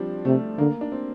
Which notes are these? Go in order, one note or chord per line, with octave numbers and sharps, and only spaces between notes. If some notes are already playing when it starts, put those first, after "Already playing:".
Already playing: F3 G3 C4 D4
C3 A3
D3 A#3
D4
C4